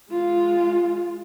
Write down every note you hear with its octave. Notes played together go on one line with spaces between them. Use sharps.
G#3 F4